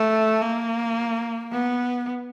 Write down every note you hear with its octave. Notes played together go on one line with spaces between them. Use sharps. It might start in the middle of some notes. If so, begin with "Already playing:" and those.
Already playing: A3
A#3
B3